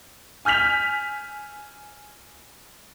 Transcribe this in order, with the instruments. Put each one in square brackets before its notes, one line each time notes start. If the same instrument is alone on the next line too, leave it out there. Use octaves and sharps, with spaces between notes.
[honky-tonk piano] G#5 F6 G6 B6 F7